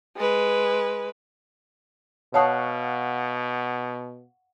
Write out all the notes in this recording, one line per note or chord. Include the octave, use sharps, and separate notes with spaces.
G#3 B4
B2 C#5 F5 F#5 A5 C#6 D#6